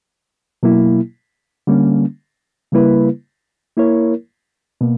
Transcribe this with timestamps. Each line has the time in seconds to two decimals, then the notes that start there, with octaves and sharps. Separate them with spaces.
0.63 B2 F#3 A#3 E4
1.67 D3 G3 A#3 C#4
2.72 C#3 G3 A#3 E4 B4
3.77 A#3 E4 A#4 C#5
4.81 B2 A#3